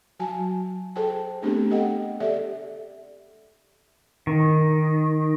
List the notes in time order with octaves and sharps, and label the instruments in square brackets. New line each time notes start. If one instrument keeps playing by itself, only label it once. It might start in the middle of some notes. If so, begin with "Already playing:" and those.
[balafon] F#3 F#4 G#5 A5
G#4 A4 C5 G5 A5
A3 B3 C4 D4 G4 G#4
G4 A4 D#5 F#5 G5
G4 A4 D5 E5
[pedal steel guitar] D#3